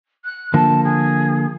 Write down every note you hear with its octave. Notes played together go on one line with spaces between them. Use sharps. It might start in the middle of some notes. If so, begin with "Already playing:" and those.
F#6
D3 F3 A#3 A5
G#4